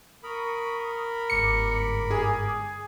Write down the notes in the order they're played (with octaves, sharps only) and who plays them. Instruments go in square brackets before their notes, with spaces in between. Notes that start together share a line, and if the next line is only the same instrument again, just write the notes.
[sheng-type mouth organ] A#4 B5 [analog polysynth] C#6 D#6
[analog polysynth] G1 G#2 D6 [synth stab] C#7
[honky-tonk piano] G#4